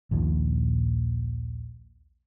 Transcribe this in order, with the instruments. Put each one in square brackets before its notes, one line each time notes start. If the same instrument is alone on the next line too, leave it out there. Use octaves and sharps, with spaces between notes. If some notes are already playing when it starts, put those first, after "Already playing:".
[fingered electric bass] A#1 D#2 A#2